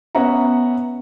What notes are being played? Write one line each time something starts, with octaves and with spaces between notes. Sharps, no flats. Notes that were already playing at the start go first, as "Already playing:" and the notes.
B3 C#4 E5 F#5 A#5